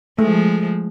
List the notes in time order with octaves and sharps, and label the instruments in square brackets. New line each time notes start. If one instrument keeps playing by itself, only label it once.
[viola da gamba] F3 G#3 [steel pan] A3